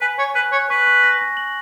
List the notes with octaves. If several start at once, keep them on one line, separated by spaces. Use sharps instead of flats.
B4 G#5
C#5 G#5
B4 F#6
C#5 F#6
B4 C#6
C#6
A#6
A#6
F#7